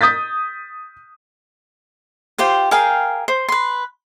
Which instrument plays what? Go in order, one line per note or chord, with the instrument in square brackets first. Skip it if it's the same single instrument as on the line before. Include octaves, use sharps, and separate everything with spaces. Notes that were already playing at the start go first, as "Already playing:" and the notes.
[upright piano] D#6 G6 A6 B6
[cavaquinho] F4 G4 C5 G5
G#4 A#4 F5 G5
C5
B4 C6